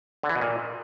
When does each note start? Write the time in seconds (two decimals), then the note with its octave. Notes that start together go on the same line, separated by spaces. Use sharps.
0.23 D3
0.29 E3
0.35 B2
0.41 A#2